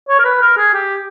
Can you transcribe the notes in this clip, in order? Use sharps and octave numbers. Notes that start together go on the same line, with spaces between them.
C#5
A#4
B4
A#4
G#4
G4